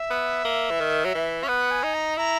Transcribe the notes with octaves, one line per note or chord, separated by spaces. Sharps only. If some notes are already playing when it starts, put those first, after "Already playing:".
Already playing: E5
B3
A#3
E3
D#3
F#3
E3
C#4
B3 F#5
G#5
D#4
A#5
E4 A#5